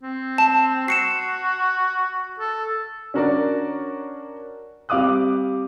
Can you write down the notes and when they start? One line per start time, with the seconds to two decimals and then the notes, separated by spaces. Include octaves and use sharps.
0.03 C4
0.38 A5
0.88 F#4 C7 C#7 E7
2.40 A4
3.14 C#4 D4 F#4 A#4 C#5 D5
4.89 G3 C4 F5 D6 D#6 F#6